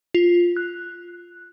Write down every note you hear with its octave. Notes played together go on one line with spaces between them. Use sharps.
F4
F#6